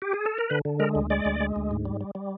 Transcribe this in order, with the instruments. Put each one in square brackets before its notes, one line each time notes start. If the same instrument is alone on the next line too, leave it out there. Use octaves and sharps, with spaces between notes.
[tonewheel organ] G4
G#4
A4
A#4
D3 B4
D3
G#3 A#4
D2
G#3 D5
D2
G#3
D2
G#2
G3
G3
G3